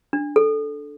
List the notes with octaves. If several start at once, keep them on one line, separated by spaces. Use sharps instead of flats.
D4
A4